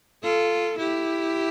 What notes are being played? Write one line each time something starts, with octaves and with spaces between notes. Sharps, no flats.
F4 A4
E4 G4